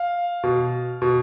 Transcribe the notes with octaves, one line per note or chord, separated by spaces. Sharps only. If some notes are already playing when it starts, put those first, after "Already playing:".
Already playing: F5
B2
B2